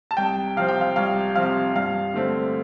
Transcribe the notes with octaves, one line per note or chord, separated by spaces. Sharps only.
A5
C2 G5
C3 F3 C4 F5
G5
F5
C2 F5
C3 F3 C4 F5
G2 F5
D3 A3 C4